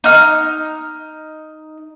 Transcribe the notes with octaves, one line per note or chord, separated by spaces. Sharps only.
D#4 F6